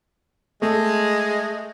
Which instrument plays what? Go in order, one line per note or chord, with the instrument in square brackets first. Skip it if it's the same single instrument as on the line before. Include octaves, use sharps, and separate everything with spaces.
[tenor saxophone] G#3 [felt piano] A3